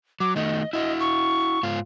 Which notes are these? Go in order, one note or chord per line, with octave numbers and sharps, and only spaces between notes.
F#3 D6
D#3 A3 D#5
E4 F#4 D#5
C#6
G#2 F4